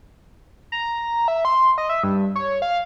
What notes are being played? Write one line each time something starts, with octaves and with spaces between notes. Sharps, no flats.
A#5
E5
C6
D#5
E5
G2
C#5
F5